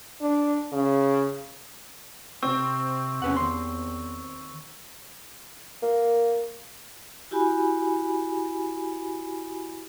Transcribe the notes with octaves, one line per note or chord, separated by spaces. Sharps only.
D4
C#3
C3 C4 C#6 E6
E2 C#4 B4 F#5
D#2 C6
A#3
E4 F#4 G4 G#5 B5